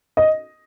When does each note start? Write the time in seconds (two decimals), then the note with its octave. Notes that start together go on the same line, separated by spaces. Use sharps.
0.17 D#5